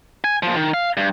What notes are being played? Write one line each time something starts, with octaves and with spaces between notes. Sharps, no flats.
G#5
A#2 F3
D#3
F5
G2